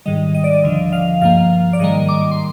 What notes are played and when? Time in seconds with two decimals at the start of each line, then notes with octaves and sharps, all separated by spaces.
0.06 G#2 D#3 G3 D#5
0.35 D#5
0.44 D5
0.53 D#5
0.64 D2 D3 F3
0.92 F5
1.21 G2 F3 A#3 F5
1.73 D5
1.80 G#2 D#3 G3 A#3 D#5
2.09 D6
2.31 C6